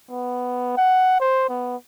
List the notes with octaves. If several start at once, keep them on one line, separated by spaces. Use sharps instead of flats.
B3
F#5
C5
B3